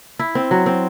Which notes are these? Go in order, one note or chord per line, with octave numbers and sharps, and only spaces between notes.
E4
C4
F#3
C4